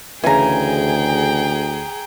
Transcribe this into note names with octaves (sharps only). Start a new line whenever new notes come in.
D2 C#3 E3 G#4 G5 G#5 A#5